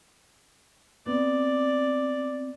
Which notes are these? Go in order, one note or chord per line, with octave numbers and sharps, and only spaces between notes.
B3 C4 D5